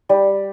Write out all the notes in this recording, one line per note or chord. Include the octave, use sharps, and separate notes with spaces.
G3